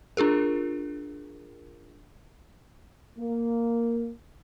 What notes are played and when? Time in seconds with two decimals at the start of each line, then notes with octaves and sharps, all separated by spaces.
0.17 D4 F4 G#4 A#4
3.18 A#3